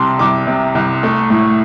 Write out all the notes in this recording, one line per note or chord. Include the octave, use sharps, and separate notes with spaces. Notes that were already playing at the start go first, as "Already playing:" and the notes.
Already playing: C2 C3 G3 A5 C6
C2 D6
C3
C2
A3
A2